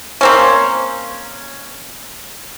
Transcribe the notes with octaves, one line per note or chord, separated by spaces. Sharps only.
A#3 C4 C#4